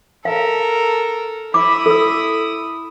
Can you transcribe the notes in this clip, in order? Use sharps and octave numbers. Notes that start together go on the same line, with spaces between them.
A4 A#4 F5
E4 D6 D#6
A4 E6